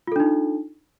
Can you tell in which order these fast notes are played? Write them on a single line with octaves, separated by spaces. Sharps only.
F4 A4 D4 D#4